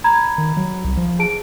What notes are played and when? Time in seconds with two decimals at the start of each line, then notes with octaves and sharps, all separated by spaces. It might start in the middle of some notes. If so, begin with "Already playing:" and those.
0.04 A#5 B5 G#6
0.38 D#3
0.57 F#3
0.84 C2
0.97 F3
1.19 G#4 A5 D7